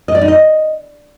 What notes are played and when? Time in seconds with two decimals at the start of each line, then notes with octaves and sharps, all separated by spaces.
0.08 D#5
0.15 D5
0.21 D#4
0.28 D#5